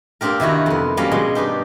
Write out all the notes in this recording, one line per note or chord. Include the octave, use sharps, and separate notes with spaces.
A#3 C4 D4 G4 A#4
C3 D#3 E4 F#4
F2 B3
F#3 G3 A#3 C#4 A#4
B2 F#3 G#3
G2 D4 D#4 G4